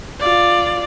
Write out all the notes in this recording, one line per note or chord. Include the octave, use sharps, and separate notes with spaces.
F4 D5